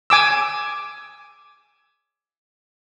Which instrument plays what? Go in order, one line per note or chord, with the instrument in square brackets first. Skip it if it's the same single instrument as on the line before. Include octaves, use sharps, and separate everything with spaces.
[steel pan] G#5 D6 E6